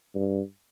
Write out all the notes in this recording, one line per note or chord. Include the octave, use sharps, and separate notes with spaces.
G2